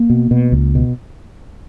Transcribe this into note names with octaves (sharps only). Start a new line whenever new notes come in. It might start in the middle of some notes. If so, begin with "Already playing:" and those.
Already playing: A#3
B2
B2
C#2
B2